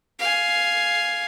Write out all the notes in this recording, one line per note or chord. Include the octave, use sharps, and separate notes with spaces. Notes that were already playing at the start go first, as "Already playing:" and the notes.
F5 G#5